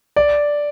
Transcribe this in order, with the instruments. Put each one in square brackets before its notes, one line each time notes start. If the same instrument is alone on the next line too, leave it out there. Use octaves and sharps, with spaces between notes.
[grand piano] D5